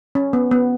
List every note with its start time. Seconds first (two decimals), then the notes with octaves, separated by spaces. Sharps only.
0.15 C#4
0.33 B3
0.51 B3